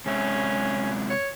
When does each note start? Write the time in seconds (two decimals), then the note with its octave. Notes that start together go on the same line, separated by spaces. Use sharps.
0.06 C3 G#3 C#4 E5
1.10 C#5